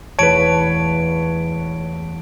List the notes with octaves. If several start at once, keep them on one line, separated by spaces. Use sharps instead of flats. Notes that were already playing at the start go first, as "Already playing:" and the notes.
E1 E2 A3 B4 C#5 A5 D7